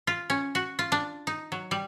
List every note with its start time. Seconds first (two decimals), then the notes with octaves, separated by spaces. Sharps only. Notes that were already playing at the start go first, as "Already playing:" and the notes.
0.07 F4
0.30 C#4
0.55 F#4
0.79 F4
0.92 D4
1.27 D#4
1.52 F#3
1.71 G3